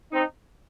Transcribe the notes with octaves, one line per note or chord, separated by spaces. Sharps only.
C4 D#4